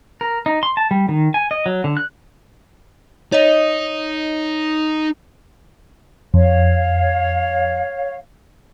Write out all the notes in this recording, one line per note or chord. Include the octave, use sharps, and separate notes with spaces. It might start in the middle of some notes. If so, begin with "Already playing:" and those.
A#4
D#4
C6
A5
G3
D#3
G#5
D#5
F#3
D3
F#6
D#4 C#5 D#5
F2 C#5 F5